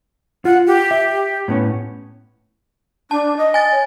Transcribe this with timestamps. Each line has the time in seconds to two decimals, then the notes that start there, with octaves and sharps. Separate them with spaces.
0.45 F4 F#5
0.67 G4
0.91 E5
1.48 A2 B3 C#4
3.11 D4 A5
3.37 D#5
3.54 G#5 A6
3.72 C#5